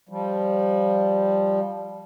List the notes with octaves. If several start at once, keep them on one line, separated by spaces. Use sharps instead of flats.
F3 G3